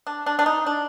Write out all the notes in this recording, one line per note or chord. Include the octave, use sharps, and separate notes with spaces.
D4
D4
D4
D#4
D4